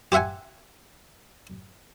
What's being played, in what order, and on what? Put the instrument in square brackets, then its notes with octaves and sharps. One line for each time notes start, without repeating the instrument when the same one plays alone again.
[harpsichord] G4 C5 E5 F#5 G#5